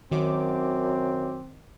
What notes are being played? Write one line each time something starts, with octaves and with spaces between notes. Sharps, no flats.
F#2 D#3 F#3 C4 D6